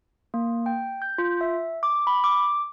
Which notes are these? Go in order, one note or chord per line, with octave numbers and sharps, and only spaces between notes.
A#3
G5
G6
F4
E5
D6
B5
D6